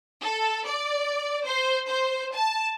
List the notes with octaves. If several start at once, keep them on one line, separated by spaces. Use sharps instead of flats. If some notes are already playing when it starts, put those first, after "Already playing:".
A4
D5
C5
C5
A5